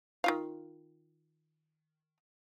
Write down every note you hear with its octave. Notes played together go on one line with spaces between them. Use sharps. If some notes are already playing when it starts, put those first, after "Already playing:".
D#3 F4 F5